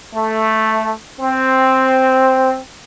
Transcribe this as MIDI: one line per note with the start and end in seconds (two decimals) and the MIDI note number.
0.14 0.91 57
1.20 2.58 60